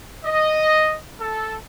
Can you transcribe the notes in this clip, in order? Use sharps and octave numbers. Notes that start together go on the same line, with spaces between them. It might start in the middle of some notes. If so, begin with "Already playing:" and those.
D#5
A4